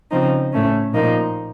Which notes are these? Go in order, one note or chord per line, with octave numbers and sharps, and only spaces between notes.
C#3 F3 C4 D#4
A2 A3 C#4
A#2 F3 A#3 D#4